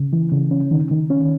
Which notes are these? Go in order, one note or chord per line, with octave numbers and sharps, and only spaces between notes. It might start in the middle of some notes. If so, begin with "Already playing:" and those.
Already playing: C#3
E3
C#3
C#4
D#3
D#3
C#4